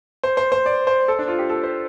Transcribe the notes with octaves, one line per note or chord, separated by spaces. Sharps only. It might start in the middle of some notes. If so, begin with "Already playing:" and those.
C5
C5
C5
D5
C5
A4
D4
F4
G4
A4
C5